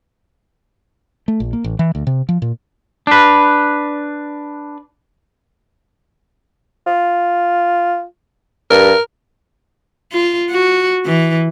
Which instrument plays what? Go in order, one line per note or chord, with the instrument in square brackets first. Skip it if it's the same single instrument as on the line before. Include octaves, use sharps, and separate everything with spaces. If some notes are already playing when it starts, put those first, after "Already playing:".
[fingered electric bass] A3
A#1
A#3
A1
E3
D2
C3
F3
A#2
[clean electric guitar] D4 B4
[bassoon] F4
[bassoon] G2 [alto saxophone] A#4
[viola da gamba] F4
F#4
E3